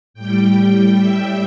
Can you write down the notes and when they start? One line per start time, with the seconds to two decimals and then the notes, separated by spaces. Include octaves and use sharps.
0.14 A2 G3 G5
0.96 E5